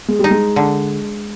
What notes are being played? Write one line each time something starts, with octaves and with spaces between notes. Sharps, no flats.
G#3
G3 D#4
G#3
D3